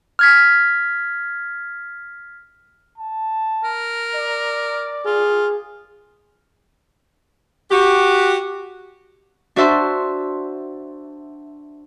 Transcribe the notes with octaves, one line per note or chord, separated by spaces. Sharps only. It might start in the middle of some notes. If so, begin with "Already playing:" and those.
F6 G#6 B6
A5
A#4
D5
F4 G#4
F#4 G4
D4 F#4 C5 E5 A5 C6